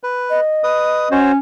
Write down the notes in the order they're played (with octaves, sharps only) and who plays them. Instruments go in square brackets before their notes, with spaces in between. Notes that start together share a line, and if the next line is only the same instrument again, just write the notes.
[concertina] B4
[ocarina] D#5
[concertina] B4 D#6
[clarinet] C#4 [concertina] F#4 C5 C#5